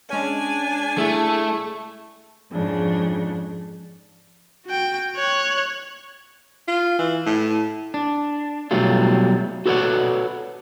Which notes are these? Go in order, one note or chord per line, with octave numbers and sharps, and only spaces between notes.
G#3 C#4 D4 G#5
A3 E4 G#4
F2 G#2 C#3 D4
F#4 G5
C#5 F#6
F4
E3
A2
D4
B1 F#3 G3 A3 F4
F#4 A4 B4 C#5 D5 F#5